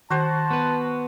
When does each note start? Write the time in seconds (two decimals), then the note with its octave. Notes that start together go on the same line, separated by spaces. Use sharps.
0.10 D#3 F#4 C5 A5
0.51 B3 B4